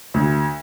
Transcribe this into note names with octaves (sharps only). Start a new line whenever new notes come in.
D2